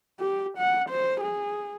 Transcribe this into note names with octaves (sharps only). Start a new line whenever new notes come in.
G4
F#5
C5
G#4